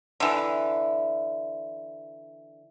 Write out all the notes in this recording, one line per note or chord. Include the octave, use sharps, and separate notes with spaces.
D3 E3